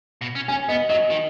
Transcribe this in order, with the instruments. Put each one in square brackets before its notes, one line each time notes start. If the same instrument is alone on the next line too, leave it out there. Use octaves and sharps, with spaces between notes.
[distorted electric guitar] B2
C#4
[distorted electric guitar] C#4 [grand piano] G#5
[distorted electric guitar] B3 [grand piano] D#5
[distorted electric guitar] F#3 [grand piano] D#5
[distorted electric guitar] D#3